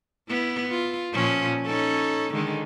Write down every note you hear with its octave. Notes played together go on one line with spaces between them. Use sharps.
B3 E4
F4
A#2 F3 C#4
C#4 D#4 A4
D3 D#3 G#3